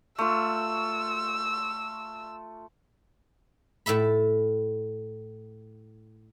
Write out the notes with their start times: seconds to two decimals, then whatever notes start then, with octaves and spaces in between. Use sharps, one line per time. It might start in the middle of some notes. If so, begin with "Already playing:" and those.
0.19 A3 F4 E6
3.86 A2 A4 E5 B5